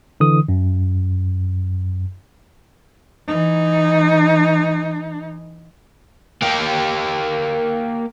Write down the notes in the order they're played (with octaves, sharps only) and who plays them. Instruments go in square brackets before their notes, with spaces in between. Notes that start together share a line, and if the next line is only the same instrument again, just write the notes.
[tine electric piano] D3 E3 D#6
F#2
[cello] E3 D#4
[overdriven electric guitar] A#3 G4